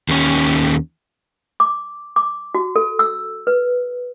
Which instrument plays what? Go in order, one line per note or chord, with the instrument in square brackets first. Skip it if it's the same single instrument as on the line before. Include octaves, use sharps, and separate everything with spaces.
[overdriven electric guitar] D#2 C#4
[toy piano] D6
D6
F#4
A4
E6
B4